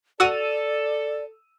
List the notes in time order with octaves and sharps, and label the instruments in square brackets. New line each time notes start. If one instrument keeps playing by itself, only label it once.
[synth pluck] F#4 F#5 A6 [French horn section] A4 [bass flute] D5 [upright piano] E6 D#7 F7